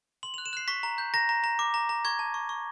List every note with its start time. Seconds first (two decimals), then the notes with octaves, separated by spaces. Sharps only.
0.23 C6 F#7
0.34 F#6 F7
0.46 E7
0.53 F#6 C7
0.68 C#6 B6
0.83 A#5
0.98 G6
1.14 A#5 A#6
1.29 A#5
1.44 A#5
1.59 D6
1.74 A#5
1.89 A#5
2.05 C#6 G#6
2.19 A5
2.34 C#6
2.49 C#6